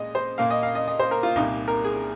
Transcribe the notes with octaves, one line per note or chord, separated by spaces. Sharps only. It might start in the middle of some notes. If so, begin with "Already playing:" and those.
Already playing: A#2 G#3 D#5
C5
A#2 A#3 F5
D#5
F5
D#5
D#5
C5
A#4
F4
C2 A#2 A#3 D#4
A#4
G#4